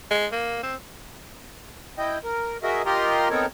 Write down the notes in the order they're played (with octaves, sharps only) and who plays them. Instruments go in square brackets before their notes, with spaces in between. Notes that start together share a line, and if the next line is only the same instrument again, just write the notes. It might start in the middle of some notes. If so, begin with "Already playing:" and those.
[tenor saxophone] G#3
A#3
C4
[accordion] E4 D#5 G5
A#4
F#4 G#4 A#4 D#5 E5
F4 G4 A#4 D#5 A#5 C6
B3 C4 D#4 A4 A#4 C#5